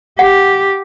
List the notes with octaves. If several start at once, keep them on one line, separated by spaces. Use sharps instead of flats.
G4 F#5